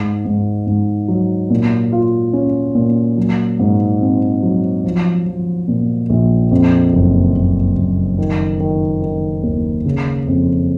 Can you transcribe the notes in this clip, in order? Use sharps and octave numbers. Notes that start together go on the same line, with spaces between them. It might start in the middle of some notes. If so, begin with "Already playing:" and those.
Already playing: G#2
G#2
G#2
F#3
A#2
F4
C#4
A#2
F#3
G#2
C4
F#3
F3
F3
A#2
A#1
F2
F#1
F#1
F#1
D#3
D#3
D#3
D#2
C#3
F2